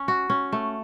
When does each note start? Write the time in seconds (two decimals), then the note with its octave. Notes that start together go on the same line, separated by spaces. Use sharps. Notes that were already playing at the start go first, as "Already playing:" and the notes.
Already playing: C#4
0.08 F#4
0.30 C#4
0.52 A3